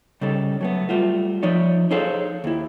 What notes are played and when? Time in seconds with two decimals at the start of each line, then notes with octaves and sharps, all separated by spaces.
0.21 C#3 G3 D#4 A4
0.61 F#3 A3 B3
0.89 G3 A3 F4 F#4
1.43 F3 D#4 C#5 D5
1.91 D#4 G#4 A4 C5 C#5 F5
2.44 D#2 E4